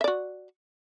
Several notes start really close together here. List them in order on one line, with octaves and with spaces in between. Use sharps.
E5 D5 F#4